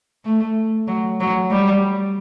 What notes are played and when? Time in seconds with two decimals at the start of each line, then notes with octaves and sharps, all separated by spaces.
0.25 A3
0.88 F#3
1.20 F#3
1.51 G3